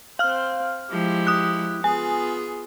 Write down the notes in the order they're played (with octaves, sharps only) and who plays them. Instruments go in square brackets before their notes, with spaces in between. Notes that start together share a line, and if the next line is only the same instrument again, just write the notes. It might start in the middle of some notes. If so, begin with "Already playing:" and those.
[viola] C4 C5 [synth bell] F5 F6
[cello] F3 G#3 [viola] E4 G4
[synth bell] D#6 F#6
[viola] B3 F4 [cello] G#4 [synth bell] G#5